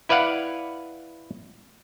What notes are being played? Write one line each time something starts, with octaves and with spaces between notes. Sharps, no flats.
E4 B4 D5 F5 F#5